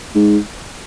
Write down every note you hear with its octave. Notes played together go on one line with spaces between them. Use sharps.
G#2